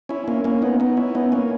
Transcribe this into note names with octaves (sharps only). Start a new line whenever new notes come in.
C#4 E4
A#3 C#4
A#3 C#4
B3 D#4
B3 D#4
C#4 E4
B3 D#4
A#3 C#4